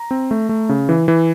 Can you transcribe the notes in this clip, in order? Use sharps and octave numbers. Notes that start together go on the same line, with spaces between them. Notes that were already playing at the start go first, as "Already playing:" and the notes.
Already playing: A#5
C4
A3
A3
C#3
E3
E3